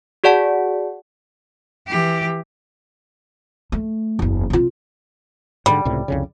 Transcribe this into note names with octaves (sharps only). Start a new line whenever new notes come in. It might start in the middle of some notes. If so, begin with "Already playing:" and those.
F#4 G#4 D5 F#5 A5
E3 G4
A3
F#1 E2
C3 F4
G#2 B2 D3 G3
C#2 A2 C3
C2 F2 C#3